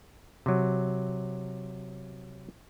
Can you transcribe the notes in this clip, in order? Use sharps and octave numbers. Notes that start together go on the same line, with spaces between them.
C3 F#3